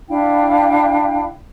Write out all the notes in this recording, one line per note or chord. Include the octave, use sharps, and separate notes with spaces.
D4 E4 F5 G5